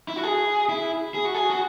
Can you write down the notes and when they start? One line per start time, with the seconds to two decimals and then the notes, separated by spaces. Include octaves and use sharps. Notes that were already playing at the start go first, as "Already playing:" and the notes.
0.08 E4
0.16 F#4
0.23 G#4
0.69 E4
1.14 G#4
1.25 F#4
1.34 G#4
1.50 F#4